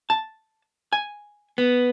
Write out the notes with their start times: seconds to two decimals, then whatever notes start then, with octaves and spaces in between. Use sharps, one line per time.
0.10 A5
0.93 G#5
1.58 B3